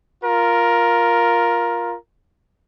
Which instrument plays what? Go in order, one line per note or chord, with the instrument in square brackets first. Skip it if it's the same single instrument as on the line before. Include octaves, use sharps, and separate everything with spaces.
[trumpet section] F4 A#4